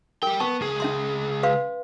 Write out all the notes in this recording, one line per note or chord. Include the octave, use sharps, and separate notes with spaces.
G3 A#4 G5
B3 A5 C#6
C#2 G#4
C#4 E5 C6
B4 F5 C6